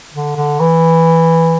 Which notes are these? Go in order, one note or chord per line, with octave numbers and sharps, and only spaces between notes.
D3
D3
E3